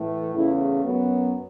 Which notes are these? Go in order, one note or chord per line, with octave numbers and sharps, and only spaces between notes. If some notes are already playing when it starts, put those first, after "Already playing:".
Already playing: A2 E3 A3
E2 C#3 A3 E4
F#2 F#3 B3